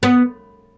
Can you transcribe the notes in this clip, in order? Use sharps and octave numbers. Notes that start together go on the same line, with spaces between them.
B3